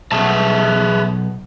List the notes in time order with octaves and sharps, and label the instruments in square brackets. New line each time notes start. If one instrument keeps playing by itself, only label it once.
[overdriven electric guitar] B1 [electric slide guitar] G#4 E5 A5